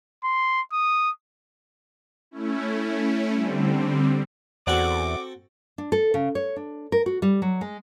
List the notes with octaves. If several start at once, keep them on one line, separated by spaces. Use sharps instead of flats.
C6
D#6
A3 C#4 E4
D3 G3 C4
E2 C4 F#4 A4 D5 F#5 D6
D4
A4
C#3
C#5
D4
A#4
F#4
G3
F#3
G#3